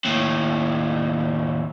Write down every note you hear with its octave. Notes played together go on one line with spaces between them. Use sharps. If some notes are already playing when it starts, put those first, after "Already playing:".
D#2 A2